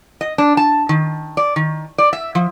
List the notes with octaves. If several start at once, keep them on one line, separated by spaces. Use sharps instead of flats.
D#5
D4
A5
D#3
D5
D#3
D5
E5
F3